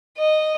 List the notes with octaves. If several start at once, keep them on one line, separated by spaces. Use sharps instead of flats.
D#5